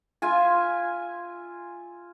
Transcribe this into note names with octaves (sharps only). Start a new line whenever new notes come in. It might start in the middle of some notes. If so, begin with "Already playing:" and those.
F4 E5 G#5